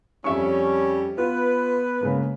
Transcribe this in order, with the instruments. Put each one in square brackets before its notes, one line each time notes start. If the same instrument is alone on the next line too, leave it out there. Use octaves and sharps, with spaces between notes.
[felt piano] F2 E5 C#6 [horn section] G3 C#4
[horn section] B3 B4 [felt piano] F4
[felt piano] C#3 G#3 A#3